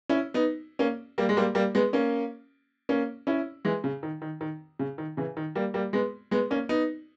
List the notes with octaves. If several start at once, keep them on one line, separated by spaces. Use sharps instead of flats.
C#4 E4
B3 D#4
A#3 C#4
G3 A#3
G#3
G3 A#3
G3 A#3
G#3 B3
A#3 C#4
A#3 C#4
C#4 E4
E3 G#3
C#3
D#3
D#3
D#3
C#3
D#3
C#3 E3
D#3
G3 A#3
G3 A#3
G#3 B3
G#3 B3
A#3 C#4
B3 D#4